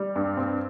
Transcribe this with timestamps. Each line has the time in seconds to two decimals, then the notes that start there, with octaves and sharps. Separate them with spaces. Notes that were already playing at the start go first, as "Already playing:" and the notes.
Already playing: G3
0.16 G2
0.37 C4